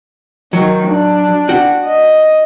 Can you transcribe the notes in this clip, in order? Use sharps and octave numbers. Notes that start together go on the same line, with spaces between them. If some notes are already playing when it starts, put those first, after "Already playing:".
D#3 F#3
D4
F#4 G5
D#5